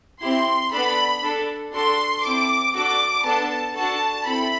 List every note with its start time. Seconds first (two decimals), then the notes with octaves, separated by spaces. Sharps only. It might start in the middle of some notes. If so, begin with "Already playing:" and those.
0.20 C4 E4 G4 C6
0.71 B3 D4 A4 B5
1.23 D4 A4
1.73 D4 F#4 A4 C6
2.23 C4 E4 A4 D6
2.74 D4 F#4 A4 D6
3.25 B3 D4 A4 A5
3.75 D4 F#4 A4 A5
4.25 C4 E4 A4 B5